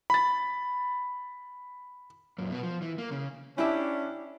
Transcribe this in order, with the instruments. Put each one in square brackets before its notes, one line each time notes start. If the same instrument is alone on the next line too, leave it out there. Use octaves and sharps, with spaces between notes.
[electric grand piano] B5 A6
[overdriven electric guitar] F#2 A#2
B2 F#4
F3
E3
A#3
C#3
[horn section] C#4 D4 [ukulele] E4 G4 E5